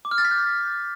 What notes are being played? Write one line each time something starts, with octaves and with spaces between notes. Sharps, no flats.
D6
F6
A6
B6
G6